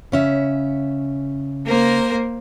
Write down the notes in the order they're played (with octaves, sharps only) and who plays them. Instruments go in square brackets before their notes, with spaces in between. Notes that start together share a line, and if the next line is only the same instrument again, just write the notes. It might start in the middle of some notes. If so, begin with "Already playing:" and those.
[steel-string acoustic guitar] C#3 C#4 E5
[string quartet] A#3 A#4 C5